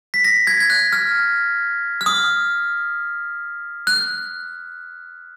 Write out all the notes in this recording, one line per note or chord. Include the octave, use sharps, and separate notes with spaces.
B6
A#6
G#6
G#6
F#6
F6
F6
D#6
F#6